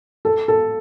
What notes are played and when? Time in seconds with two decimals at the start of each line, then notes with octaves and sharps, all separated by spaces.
0.25 A4
0.48 A4